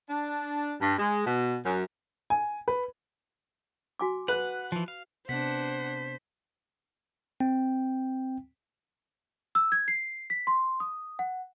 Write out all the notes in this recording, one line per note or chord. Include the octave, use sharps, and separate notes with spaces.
D4
G2
G#3
B2
F#2
G#5
B4
F#4 G#5 D6
B4 F#5
E3 F3
F5
C3 B3 D4 C5 F#5 B6
C4 G5
E6
G#6
C7
B6
C6
D#6
F#5